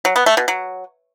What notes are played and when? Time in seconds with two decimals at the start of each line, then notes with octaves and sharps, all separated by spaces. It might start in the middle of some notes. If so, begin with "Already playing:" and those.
0.05 F#3
0.16 B3
0.26 A3
0.37 B2
0.48 F#3